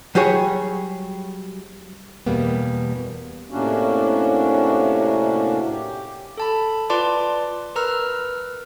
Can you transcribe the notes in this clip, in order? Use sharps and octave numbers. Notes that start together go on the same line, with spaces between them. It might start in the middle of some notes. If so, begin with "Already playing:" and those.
F#3 G3 F#4 G#4 C#5
E2 B2 G3 A#3 B3
A2 C3 A#3 C#4 D4 F#4
G4
A4 A5 B5
F4 B4 D5 A5 C6 D6
A#4 B4 A#5 E6 F6